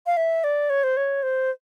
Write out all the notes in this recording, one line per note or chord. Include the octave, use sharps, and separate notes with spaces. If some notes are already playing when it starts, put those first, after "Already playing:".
F5
E5
D5
C#5
C5
C#5
C5